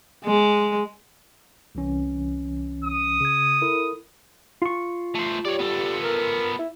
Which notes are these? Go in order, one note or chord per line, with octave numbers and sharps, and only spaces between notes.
G#3
C2 E3 C#4
D#6
C#3 G#6
E4 A4 A#4
F4 C#6
A3 C5
G3 C#5 D5
B3 A4
A#4
E4